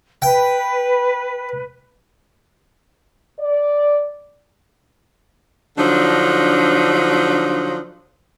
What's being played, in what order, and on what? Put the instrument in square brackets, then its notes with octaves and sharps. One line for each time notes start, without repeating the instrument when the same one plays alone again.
[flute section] B4 [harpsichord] G5
[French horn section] D5
[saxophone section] D3 F3 F#3 D4 D#4